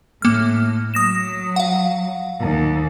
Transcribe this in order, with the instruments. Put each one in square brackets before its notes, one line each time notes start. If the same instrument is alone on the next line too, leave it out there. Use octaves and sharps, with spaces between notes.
[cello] A2 [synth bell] A#3 F6
[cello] F#3 [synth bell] D#6 A#6 E7
[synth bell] F5 F#5
[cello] D#2